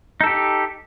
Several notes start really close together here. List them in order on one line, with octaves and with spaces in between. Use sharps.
D#4 A4 G4